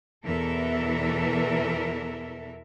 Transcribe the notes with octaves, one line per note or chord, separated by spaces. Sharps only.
E2 B2 E3 A4 A#4 E5